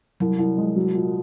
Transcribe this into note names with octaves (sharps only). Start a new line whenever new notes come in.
C2 F#3
C2
G#3
F#3
A#2